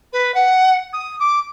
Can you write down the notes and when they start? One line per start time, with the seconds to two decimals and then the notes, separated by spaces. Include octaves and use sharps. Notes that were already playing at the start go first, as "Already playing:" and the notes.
0.12 B4
0.34 F#5
0.93 D#6
1.19 D6